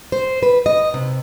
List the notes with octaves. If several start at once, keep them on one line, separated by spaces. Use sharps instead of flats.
C5
B4
D#5
C3